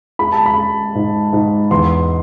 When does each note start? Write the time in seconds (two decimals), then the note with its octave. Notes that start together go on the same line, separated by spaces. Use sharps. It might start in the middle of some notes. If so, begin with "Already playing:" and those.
0.19 G#3 B5
0.32 A5
0.46 B5
0.57 G#3
0.95 G#2
1.33 G#2
1.71 E2 C6